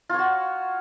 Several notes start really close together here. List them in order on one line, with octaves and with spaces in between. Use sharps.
F4 C#5 F#4